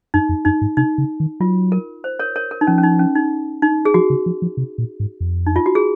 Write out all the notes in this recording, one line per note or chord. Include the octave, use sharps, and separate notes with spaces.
F#2 D#4
F2
F#2 D#4
G#2
C3 D#4
C#3
D#3
F#3 F4
A#4
C5
A#4 C#5
A#4 C#5
A#4
D#4
F3 C#4
C#4
D#4
C#4
D#4
D#4
G#4
F3 F#4
C#3
F3
F3
C3
A#2
G#2
F2
D#4
F4
F#4
G#4